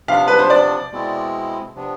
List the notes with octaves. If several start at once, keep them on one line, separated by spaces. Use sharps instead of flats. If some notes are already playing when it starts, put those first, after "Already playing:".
C3 F3 B3 D4 F5
B4
C5
D5
B2 G#3 C4 E4
C3 F3 B3 D4